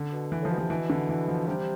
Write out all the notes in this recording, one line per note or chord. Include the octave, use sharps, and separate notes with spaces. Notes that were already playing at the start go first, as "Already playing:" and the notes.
Already playing: D3
B2
E3
A2 F3
B2
C3 F3
B2 E3
D3
E3
F3
C3 G3